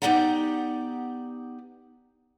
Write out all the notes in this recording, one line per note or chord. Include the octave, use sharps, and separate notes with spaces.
B3 D#4 G4 D5 F#5 A#5